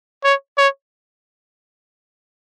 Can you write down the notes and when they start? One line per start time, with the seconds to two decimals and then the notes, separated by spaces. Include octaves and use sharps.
0.24 C#5
0.58 C#5